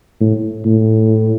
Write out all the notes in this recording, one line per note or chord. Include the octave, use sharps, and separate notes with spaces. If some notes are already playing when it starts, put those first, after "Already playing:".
A2
A2